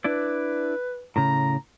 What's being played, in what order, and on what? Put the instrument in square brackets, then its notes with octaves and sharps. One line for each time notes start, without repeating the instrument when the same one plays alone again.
[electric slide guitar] D4 E4 D5 [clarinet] B4
[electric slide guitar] A2 C#3 [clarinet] A#5